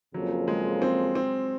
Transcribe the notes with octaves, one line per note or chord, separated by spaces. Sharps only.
F2 C#3 F3 F#3 A#3 F4
G#3
C4
C4